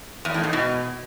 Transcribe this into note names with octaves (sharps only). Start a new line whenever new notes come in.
E2
A2
G#2
B2